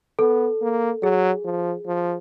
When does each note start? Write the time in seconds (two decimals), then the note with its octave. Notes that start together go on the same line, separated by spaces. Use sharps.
0.19 B3 A4
0.61 A#3
1.02 F#3 G#4
1.44 F3
1.86 F3